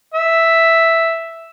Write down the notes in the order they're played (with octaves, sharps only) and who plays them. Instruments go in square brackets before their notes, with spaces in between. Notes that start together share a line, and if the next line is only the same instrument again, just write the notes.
[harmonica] E5